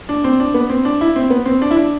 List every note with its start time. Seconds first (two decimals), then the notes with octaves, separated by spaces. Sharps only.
0.09 D4
0.24 C4
0.40 D4
0.54 B3
0.70 C4
0.85 D4
1.01 E4
1.16 C4
1.30 B3
1.46 C4
1.62 D4
1.71 E4
1.77 D4